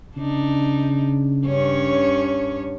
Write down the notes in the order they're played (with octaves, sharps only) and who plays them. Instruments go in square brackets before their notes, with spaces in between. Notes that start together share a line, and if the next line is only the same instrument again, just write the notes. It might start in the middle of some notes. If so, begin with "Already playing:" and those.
[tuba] C#3 [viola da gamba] D4 D#4
[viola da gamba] G2 C#4 C#5